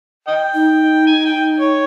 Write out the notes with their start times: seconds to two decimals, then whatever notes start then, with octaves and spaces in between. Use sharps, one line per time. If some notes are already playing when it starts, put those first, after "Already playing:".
0.27 D#5 G5
0.54 D#4
1.07 G#5
1.25 G5
1.60 C#5